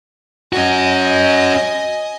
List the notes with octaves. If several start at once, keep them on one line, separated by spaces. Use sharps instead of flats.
C#4 F#4 D#5 G#5